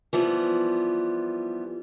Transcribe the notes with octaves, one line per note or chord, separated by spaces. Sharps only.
E3 F3 G3 B3